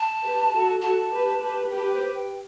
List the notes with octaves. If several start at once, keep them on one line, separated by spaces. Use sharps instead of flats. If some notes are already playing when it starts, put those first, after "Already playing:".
Already playing: A5
G4 B4
F#4 A4
F#4 A4 A5
G4 B4
G4 B4
G4 B4 G5
A5
G5
C5
G5